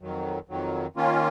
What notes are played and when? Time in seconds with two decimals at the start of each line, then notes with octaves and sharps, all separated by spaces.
0.01 F2 D#3 F#3
0.49 F2 D#3 F#3
0.96 D#3 A#3 C#4 F4